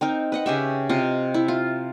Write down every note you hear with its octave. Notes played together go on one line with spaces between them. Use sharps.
C4 D#4 A#4
B4 D#5 F#5
C#3 C#4 G4 E5
C3 F4 D#5
E4
F4